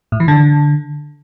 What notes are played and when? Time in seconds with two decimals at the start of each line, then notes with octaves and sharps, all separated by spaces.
0.12 A2
0.20 E3
0.28 D3